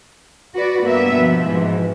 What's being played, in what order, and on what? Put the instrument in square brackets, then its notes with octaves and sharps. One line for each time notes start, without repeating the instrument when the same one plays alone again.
[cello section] F#4 B4 D5
[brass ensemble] G2 B3 [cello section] A#3 E5
[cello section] B2 F3
[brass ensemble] G#2 C3 E3